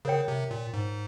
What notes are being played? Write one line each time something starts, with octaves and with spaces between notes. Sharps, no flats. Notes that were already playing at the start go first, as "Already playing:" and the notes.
C#3 A#4 C#5 G5
C3
A#2
G#2